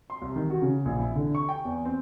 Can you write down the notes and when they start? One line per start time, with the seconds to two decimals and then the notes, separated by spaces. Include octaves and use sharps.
0.10 C6
0.22 C2
0.36 D#3
0.50 F#4
0.62 C#3
0.85 A#1
0.99 E4
1.15 D3
1.35 C#6
1.49 G5
1.65 E2
1.85 C4